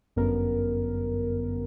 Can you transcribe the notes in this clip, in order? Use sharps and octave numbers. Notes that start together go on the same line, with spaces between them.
G1 F#2 D3 B3 A#4